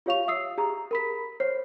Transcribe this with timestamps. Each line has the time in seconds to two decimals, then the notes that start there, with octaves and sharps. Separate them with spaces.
0.06 F4 G4 C#5 F5 C#6 F7
0.28 E5 D#6 E6 C7
0.58 G4 G#4 A#5
0.91 A#4 B5 B6
1.40 C5 C#5 C7